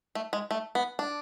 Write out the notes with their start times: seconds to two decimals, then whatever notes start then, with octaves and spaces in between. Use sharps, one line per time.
0.15 A3
0.33 G#3
0.51 A3
0.75 B3
0.99 D4